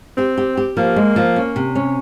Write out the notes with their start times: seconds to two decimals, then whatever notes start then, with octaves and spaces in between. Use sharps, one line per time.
0.17 C4 G4
0.38 G4
0.57 G4
0.77 F3 A#3
0.96 G#3
1.16 F3
1.36 C#4
1.56 C3
1.75 C#4